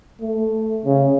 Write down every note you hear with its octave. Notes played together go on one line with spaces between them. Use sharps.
A3
C#3